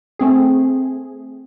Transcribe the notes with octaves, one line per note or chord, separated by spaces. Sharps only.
A3 C4 G#4